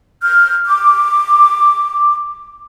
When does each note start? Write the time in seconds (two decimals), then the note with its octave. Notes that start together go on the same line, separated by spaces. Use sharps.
0.22 F6 G6
0.65 D6